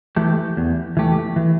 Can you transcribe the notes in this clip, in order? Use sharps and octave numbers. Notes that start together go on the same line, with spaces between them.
E3 A3 G4
E2
E3 A3 G4
E3